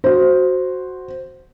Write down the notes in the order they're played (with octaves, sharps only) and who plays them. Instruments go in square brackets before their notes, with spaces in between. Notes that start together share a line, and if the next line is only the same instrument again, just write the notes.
[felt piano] F#4 C5